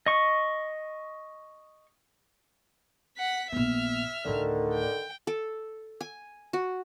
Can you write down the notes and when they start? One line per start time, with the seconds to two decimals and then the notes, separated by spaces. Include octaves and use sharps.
0.06 D#5 C#6
3.18 F#5 B6
3.52 A#1 B3 E5 F6
4.25 D2 A2 D3 D#3
4.73 G5
5.27 A4
6.01 G#5
6.53 F#4